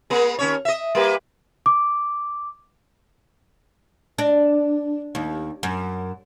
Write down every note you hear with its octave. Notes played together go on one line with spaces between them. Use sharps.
G#3 A#3
D#2 C#4 C#5
D#5 E5
G3 A#3 B4
D6
D4
D#2
F#2